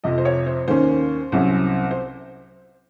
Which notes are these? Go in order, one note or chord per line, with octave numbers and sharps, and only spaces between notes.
F2 C3 F3 D#5
C5
C#5
C5
D#2 D#3 A#3 C#4 C5
C2 C3 F#3 C#4
C5